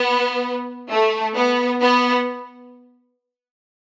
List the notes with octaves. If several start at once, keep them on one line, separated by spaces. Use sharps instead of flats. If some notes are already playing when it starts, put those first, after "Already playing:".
Already playing: B3
A3
B3
B3